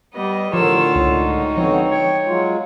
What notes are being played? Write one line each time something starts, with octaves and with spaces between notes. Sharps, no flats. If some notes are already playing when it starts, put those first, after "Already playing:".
G3 B3 D#5
A2 D3 F3 F4 A#4 C#5 E6
C#2 G#3 D#4 F#4
D3 F3 B3 C4 C#5
C#5 G5
F#3 G#3 F4